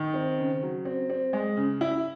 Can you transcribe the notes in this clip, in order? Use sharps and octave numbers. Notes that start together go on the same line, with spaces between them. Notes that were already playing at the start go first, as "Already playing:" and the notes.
Already playing: D#3
C4
C#3
F#3
C4
C4
G#3
C#3
E4